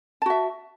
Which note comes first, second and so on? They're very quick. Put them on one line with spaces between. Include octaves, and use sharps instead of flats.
A5 F#4 E5